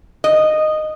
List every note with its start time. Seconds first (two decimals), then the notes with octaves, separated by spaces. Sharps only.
0.24 D#5